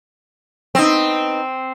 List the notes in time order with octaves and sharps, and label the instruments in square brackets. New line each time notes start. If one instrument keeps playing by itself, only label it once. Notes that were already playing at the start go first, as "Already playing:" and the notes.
[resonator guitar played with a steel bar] B3 D#4 [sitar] C4